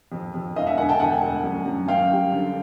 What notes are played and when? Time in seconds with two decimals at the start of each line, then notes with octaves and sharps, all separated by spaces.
0.12 F2
0.34 F2
0.56 E1 D#5 F5
0.67 E5 F#5
0.78 D3 F#5 G#5
0.89 G5 A5
1.00 E1 F#5 G#5
1.22 D2
1.44 F#2
1.66 F#2
1.88 F#2 F5 G5
2.11 G3
2.32 D3